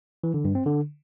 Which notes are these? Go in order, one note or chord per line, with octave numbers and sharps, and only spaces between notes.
E3
D3
G2
C4
D3